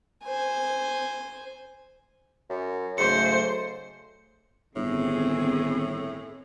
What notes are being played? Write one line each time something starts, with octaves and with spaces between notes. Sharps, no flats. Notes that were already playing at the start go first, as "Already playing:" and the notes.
C5 G#5
F#2
G#2 C#3 F#3 A3 C5 C#7
G1 A2 D#3 C4 G#4